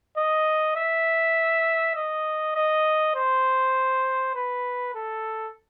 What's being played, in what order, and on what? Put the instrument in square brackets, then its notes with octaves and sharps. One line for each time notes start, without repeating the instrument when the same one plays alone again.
[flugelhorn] D#5
E5
D#5
D#5
C5
B4
A4